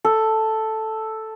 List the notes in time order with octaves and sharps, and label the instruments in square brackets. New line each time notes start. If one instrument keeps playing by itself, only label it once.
[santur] A4